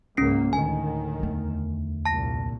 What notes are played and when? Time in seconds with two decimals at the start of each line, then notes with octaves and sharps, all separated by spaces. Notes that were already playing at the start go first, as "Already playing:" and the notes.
0.17 C#2 G#2 A#3 C#4 C7
0.53 D2 A2 D#3 G#5
1.20 E2 A3
2.05 C2 A#2 A5 A#6